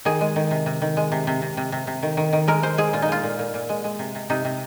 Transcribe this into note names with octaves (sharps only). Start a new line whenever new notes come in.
D#3 G#4
G#3
D#3
C3
C3
D#3
G#3
C3
C3
C3
C3
C3
C3
D#3
D#3
D#3
G#3 A#4
G#3 C5
G#3 G#4
A#2 F4
D#4
G#3 F4
A#2
A#2
A#2
G#3
G#3
C3
C3
C3 D#4
C3